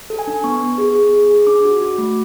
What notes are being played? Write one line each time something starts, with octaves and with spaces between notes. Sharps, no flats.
A4
G#5
D4
B3 C#6
B3
G#4
G#4
G#4
G#4
D4 D6
F#4
F#4
A3